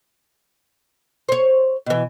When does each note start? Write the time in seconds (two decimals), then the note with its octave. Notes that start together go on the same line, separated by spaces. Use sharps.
1.29 C5 C#5
1.86 B2 E3